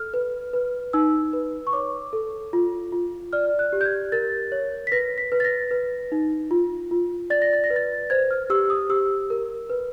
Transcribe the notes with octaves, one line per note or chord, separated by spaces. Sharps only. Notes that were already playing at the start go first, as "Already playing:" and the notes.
Already playing: A4 F6
B4
B4
D#4 E6
B4
C#6
C#5 D6
A4
F4
F4
D5 F6
F#6
G4
G6
G#6
A#4 A6
C#5
B6
B4 A#6
B6
B4
A6
A#6
B4
D#4
F4
F4
D5 A6
A#6
A6
A#6
B4
A6
C5 G#6
F6
G4 E6
D#6
G4 E6
A#4
B4